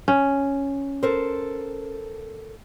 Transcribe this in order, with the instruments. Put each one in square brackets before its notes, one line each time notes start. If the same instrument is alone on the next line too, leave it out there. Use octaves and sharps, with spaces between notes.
[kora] C#4
[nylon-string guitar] A4 A#4 C5